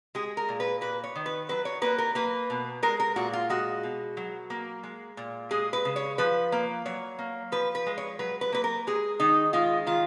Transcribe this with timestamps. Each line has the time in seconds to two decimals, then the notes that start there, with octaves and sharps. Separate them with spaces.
0.15 G#3 G#4
0.37 A#4
0.48 A#2
0.60 B4
0.81 A#3 B4
1.04 C#5
1.15 D#3
1.26 B4
1.49 F#3 B4
1.65 C#5
1.82 A#3 B4
1.98 A#4
2.15 A#3 B4
2.50 B2
2.83 G#3 A#4
3.00 A#4
3.16 A#2 F#4
3.33 F4
3.50 G#3 F#4
3.83 B2
4.17 F#3
4.50 A#3
4.83 G#3
5.17 A#2
5.51 G#3 G#4
5.73 B4
5.85 C#3
5.96 C#5
6.18 F3 B4
6.52 A#3
6.85 F#3 C#5
7.19 A#3
7.52 F3 B4
7.75 B4
7.86 G#3
7.98 C#5
8.19 F#3 B4
8.41 B4
8.52 A#3 B4
8.64 A#4
8.87 G#3 G#4
9.20 D#3 D#4
9.53 G#3 F4
9.87 D#3 F4